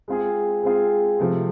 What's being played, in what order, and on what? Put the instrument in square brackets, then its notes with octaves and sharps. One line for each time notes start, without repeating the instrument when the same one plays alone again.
[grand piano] G#3 C4 F4 G#4
G#3 C4 F4 G#4
C3 F3 A3